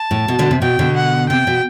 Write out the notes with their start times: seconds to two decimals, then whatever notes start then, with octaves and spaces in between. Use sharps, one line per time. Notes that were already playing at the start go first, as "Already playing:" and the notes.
Already playing: A5
0.11 A2
0.28 B2
0.39 B2 D3
0.51 C3
0.62 B2 G5
0.79 B2 D3
0.96 F#5
1.29 C3 G5
1.47 B2